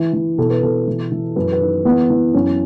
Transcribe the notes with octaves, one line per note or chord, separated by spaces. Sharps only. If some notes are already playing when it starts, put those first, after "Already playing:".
Already playing: E3
E3
B2 A4
B4
B2 A4
E3
E3
F#2 B4
B4
D#3
E3 B3
E3
F#2 C#4